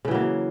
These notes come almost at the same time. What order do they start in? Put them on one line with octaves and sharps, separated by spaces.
C#3 E3 F#3 A#3